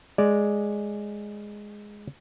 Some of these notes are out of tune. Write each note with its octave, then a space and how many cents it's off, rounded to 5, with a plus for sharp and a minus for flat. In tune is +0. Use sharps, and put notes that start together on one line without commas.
G#3 +0 D5 +0